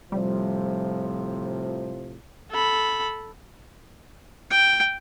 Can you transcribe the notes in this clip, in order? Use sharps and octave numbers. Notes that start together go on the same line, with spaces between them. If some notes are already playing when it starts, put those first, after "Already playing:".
A2 C3 F3 G3
A4 B5
G5